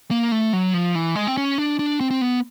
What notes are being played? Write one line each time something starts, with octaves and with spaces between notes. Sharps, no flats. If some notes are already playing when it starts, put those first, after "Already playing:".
A#3
A3
F#3
F3
E3
G#3
C4
C#4
D4
D4
C4
C4
B3